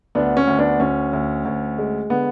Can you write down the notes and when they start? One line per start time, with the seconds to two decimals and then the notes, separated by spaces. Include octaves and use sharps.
0.15 D2 B3 D4
0.37 C#4
0.48 D2
0.58 B3 D4
0.80 D2 C#4
1.13 D2
1.45 D2
1.78 G#3
2.10 D3 B3